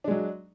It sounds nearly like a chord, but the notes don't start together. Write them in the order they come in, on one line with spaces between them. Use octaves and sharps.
D4 G#3 F#3